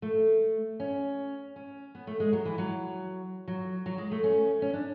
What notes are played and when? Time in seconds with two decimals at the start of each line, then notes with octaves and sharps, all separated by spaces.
0.02 A3
0.80 C#4
1.56 C#4
1.95 B3
2.07 A3
2.20 G#3
2.33 F#3
2.45 E3
2.58 F#3
3.48 F#3
3.86 F#3
3.98 G#3
4.12 A3
4.24 C#4
4.62 C#4
4.73 D4